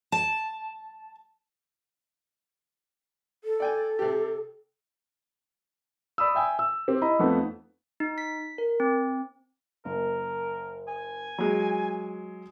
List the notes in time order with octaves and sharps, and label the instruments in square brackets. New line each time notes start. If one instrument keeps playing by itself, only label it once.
[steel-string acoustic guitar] A5
[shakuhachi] A4
[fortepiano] D5 G5 G#5
C3 G4
[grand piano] D5 B5 D#6 E6
E5 G5 G#5 E6
E6
C4 G4
E4 D#5 A#5 B5
F2 A3 B3 D#4
[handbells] D#4
B6
A#4
C4
[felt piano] F#1 [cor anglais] A#4
[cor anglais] G#5
[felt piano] F#3 G#3